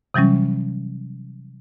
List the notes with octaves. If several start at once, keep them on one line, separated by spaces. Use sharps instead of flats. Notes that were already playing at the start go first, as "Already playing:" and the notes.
C3 E3 F#3 G3 C#4